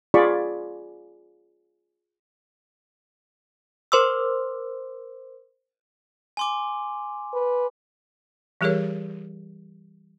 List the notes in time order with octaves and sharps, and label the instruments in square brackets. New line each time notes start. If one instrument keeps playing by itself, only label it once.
[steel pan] F4 G#4 D5 B5 C#6
[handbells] A#4 C5 C6 D6 E6
[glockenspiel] G#5 C6 D6
[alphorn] B4
[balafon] E3 G3 G4 G#4 A#4 C#5